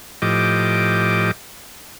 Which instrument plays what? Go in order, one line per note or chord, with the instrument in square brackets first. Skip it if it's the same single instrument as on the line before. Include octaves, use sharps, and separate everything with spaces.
[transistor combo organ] A2 F3 G4 D#5 D6